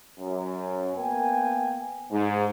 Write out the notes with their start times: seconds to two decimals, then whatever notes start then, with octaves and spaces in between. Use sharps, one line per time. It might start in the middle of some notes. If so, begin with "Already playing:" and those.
0.20 F#2
0.96 A#3 B3 A#4 G5 G#5
2.11 G#2